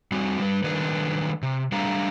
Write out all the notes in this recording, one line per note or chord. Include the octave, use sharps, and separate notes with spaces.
G3 C4 F#4
G3 B4
D#3 G3 A3 D4 B4
C3
G3 A3 D4 G4 F5 A#5